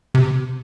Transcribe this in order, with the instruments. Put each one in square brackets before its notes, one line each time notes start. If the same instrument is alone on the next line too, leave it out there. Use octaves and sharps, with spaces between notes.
[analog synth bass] C3